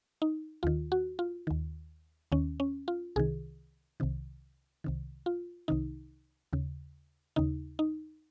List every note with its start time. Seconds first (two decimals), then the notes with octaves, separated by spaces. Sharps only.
0.22 D#4
0.63 D#2 D#3 F4
0.92 F#4
1.19 F4
1.47 D#2 D#3
2.32 D#2 D#3 C#4
2.60 C#4
2.88 F4
3.16 C2 C3 D#3 G#4
4.00 C2 C3 D#3
4.84 C2 C3 D#3
5.26 F4
5.68 C2 C3 D#3 D#4
6.53 D#2 C#3
7.36 D#2 C#3 D#4
7.79 D#4